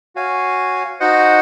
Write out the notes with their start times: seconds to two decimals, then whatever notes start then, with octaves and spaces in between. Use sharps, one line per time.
0.15 F#4 C#5 F5 G#5
1.00 D#4 F#4 C5 D#5 F#5